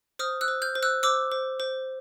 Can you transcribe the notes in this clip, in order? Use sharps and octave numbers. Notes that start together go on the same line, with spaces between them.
C5 D#6 F6
E6 F#6
C5
F6 G6
C5
E6 F#6
C5 D6 E6
C5
C5